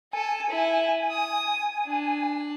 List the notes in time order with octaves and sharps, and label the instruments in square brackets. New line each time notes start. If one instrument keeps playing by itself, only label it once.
[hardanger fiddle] A4 [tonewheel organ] G#5
[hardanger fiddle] E4
D#6
D4